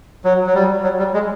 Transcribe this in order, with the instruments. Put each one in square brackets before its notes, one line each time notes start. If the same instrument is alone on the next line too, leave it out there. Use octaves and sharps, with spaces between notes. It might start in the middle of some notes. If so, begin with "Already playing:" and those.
[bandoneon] F#3
F#3
G3
F#3
G3
G#3